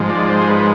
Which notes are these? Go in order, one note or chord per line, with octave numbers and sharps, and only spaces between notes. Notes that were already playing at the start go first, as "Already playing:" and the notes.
Already playing: G#2 F3 G#3
D5
C5
G#4
B4